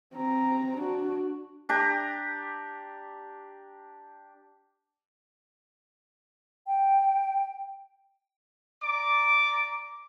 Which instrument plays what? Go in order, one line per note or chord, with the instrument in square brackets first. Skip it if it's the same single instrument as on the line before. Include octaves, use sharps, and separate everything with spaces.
[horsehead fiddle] C4 A#5
D4 F#4
[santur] D4 G4 A#5
[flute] G5
[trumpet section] D5 A#5 D6